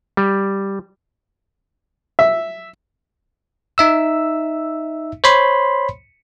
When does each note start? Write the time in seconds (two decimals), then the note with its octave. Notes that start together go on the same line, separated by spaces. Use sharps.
0.17 G3
2.19 E5
3.78 D#4 E5 E6
5.24 C5 C#5 B5 C6